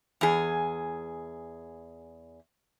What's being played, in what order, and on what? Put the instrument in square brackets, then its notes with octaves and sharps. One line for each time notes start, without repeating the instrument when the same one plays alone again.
[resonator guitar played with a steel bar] E2 G#4